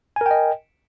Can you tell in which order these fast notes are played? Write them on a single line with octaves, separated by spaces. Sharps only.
G#5 A#4 G5 D#5